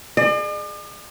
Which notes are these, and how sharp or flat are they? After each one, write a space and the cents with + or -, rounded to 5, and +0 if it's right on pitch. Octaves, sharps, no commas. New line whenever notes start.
G#4 +10 D5 +45